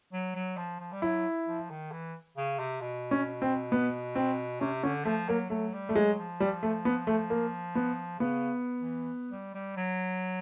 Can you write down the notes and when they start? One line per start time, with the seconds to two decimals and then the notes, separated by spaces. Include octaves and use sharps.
0.13 F#3
0.35 F#3
0.57 F3
0.80 F3
0.92 G3
1.02 F#3 E4
1.47 F3
1.70 D#3
1.92 E3
2.37 C#3
2.59 C3
2.81 B2
3.11 C#4
3.42 C4
3.72 B3
4.16 C4
4.60 C3 C#4
4.83 D3 C#4
5.05 F3 A3
5.29 F#3 A#3
5.50 F#3 A3
5.74 G3
5.89 A3
5.95 F#3 G#3
6.18 F3
6.40 G3
6.63 A3
6.85 B3
7.07 A3
7.30 A#3
7.75 B3
8.19 C#3 B3
8.79 E3
9.31 G3
9.55 G3
9.77 F#3